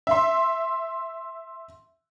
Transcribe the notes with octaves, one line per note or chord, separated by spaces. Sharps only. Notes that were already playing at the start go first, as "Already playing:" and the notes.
E5 C6